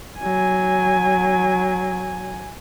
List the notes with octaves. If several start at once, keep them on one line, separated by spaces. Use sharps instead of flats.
F#3 G#5